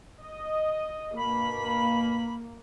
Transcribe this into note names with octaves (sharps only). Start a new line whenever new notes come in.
D#5
G2 B2 A#3 B5